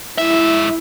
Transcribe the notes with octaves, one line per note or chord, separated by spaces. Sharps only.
G#2 E4 E5